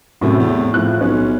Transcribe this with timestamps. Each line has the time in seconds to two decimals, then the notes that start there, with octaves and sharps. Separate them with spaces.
0.21 F#2 A2 C3
0.39 E2
0.74 A2 F3 F#6
1.01 B1 C#4